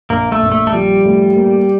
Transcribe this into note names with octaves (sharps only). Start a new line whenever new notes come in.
A#1 A#3
A3
A#1
A3
A3
F3 G3
A2
A#3